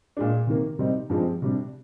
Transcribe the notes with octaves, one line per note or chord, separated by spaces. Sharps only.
A#2 G#3 D4
C3 D#3 A#3
C3 G3 C4 D#4
G2 F3 G#3 C4
C3 G3 D4